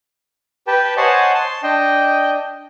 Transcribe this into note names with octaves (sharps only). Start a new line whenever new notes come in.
G4 B4 G5 A5
C5 C#5 D#5 F#5 G#5 A5
A5 C6
D4 D#5 G5